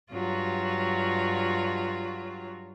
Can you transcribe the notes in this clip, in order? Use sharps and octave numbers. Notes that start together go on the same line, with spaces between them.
G2 F#3 F4